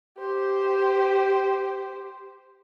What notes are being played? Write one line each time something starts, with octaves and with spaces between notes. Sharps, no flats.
G4 C5